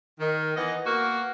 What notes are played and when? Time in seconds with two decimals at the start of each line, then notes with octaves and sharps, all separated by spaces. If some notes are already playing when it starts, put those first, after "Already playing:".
0.20 D#3
0.55 E3 B3 D#5
0.86 A#3 B3 F#4 A#4